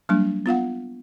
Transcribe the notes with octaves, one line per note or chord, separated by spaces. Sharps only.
F#3 G3 A#3 D4
B3 F4 F5 F#5